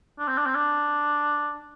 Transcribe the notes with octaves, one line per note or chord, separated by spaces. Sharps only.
D4
C4
D4
C4
D4